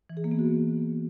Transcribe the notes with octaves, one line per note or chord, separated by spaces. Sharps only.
E3
G#4
A#3
B3
F#4